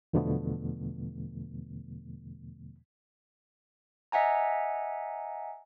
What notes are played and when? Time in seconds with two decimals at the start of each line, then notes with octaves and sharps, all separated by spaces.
0.13 E2 B2 D3 F3 A3 B3
4.12 D#5 E5 F#5 G#5 A#5